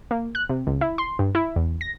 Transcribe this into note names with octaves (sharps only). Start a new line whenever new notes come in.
A#3
F#6
C3
C#2
E4
C6
G2
E4
E2
A#6